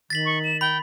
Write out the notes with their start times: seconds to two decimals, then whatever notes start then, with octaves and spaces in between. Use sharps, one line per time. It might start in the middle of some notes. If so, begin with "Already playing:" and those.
0.10 D#3 A6 B6 F#7
0.26 C#6
0.44 E7
0.61 G5 B5